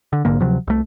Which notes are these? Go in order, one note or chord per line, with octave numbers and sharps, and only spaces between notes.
D3
A#1 G#2 D3 A#3
D2 C3 F3 F#3
C2 A3